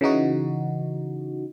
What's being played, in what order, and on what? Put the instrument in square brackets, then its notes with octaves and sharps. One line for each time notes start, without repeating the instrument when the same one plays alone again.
[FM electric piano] C#3 E3 D#4 F#4